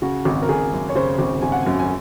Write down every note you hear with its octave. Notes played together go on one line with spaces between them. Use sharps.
C#3 F#4
G#1
A#4
G#1 G#4
F#2
C#5
C#3 C5
G#1
G#1 G#5
F#5
F#2 G#5
G#5